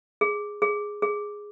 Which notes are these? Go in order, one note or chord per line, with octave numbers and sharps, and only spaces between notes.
G#4
G#4
G#4